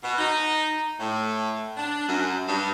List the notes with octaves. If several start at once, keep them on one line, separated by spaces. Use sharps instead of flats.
B2
D#4
A2
D4
F#2
G2